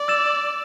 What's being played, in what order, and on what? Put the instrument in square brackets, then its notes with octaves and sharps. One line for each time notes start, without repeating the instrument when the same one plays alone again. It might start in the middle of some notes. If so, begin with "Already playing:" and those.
Already playing: [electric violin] D5
[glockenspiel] E6 A6 E7